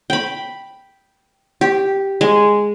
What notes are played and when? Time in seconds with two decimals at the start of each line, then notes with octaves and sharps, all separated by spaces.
0.10 G5 B5
1.61 G4
2.21 G#3